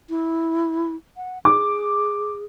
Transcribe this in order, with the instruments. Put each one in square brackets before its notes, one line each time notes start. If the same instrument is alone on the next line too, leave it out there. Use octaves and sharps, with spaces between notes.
[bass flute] E4
F#5
[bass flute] G#4 [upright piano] D6